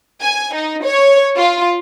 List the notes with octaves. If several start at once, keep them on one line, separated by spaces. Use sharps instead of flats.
G#5
D#4
C#5
F4